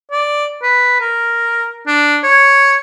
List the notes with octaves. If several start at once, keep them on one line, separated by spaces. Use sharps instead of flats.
D5
B4
A#4
D4
C#5